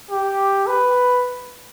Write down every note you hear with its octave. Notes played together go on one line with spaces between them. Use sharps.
G4
B4